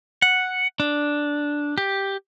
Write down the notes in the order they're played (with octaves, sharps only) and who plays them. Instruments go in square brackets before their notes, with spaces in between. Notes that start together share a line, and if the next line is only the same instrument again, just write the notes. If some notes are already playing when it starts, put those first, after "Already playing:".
[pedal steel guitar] F#5
D4
G4